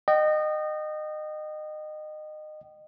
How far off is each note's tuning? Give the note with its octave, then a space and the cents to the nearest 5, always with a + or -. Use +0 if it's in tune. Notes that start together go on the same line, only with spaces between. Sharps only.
D#5 -25 G5 -30